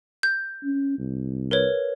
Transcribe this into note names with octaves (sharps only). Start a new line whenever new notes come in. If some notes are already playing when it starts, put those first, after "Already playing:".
G6
C#4
C2
A#4 B4 C#5